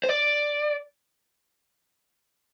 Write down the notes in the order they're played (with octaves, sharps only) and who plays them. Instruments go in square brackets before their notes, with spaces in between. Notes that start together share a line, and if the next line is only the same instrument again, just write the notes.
[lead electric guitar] C5
D5